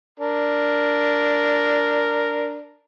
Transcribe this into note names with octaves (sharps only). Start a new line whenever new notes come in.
D4 A#4